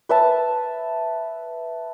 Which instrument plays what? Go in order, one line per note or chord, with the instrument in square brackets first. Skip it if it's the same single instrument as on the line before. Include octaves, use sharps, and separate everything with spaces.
[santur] B4 E5 A5